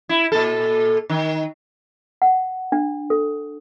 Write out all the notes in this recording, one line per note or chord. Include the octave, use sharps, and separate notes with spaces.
E4
A#2 A4
D#3
F#5
D4
A4